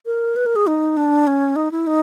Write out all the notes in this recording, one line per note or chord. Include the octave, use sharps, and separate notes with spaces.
A#4
B4
A#4
G#4
D#4
D4
C#4
D#4
E4
D#4